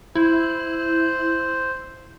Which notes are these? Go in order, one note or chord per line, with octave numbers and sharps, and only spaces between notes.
E4 C5